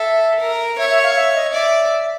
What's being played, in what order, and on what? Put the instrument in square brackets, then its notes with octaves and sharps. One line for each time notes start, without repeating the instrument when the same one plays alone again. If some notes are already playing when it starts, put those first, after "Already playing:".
Already playing: [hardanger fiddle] A4 [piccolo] E5
[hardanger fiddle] A#4
[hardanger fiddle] C#5 [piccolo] E5
[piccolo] E5
F5
E5
D#5
[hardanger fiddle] D5 [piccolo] E5